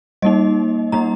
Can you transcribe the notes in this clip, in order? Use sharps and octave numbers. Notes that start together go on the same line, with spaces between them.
G3 A#3 D#4 D#5
G3 A#3 D#4 A#5